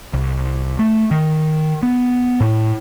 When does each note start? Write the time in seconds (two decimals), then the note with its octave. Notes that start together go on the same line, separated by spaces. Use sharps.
0.13 C2
0.79 A3
1.11 D#3
1.83 B3
2.40 A2